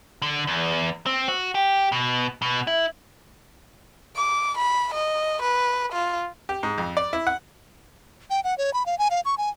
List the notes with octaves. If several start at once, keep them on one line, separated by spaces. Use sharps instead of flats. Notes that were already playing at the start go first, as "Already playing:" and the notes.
D3
E2
C4
F#4
G4
B2
B2
E4
D6
B5
D#5
B4
F4
G4
G#2
F2
D5
E4
F#5
G5
F#5
C#5
B5
F5
G#5
F5
C#6
G#5